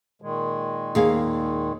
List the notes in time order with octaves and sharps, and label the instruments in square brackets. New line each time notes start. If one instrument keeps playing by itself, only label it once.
[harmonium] A#2 D#3 G#3
[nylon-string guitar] D#2 G#4 F5